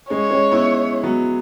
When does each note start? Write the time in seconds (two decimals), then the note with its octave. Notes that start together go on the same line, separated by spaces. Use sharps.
0.10 G#3 C#4 C#5
0.31 G#3 C#4
0.52 B3 E4
1.03 F#3 B3